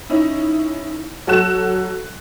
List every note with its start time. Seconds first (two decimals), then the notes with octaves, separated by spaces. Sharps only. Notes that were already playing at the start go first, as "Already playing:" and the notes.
0.10 C#4 D#4 E4
1.27 F#3 A4 F#5 F#6 E7